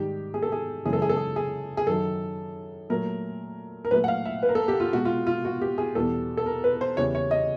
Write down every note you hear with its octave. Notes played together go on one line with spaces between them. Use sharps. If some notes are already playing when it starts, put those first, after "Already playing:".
Already playing: G#2 D#3 G3 G4
G#4
A4
G#4
F#2 C#3 E3 G#3 G#4
A4
G#4
A4
G#4
G#4
G#4
F#2 D#3 F#3 A4
A#2 F#3 A3 A#4
A#4
A#2 F#3 A3 B4
F#5
F5
E5
B4
A#4
A4
G4
F4
B2 G#3 F#4
F4
F4
F#4
G4
G#4
E2 B2 G3 A4
A4
A#4
B4
C5
E2 C#3 E3 G3 C#5
C#5
D#5